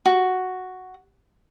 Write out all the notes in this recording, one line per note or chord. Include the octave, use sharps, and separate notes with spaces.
F#4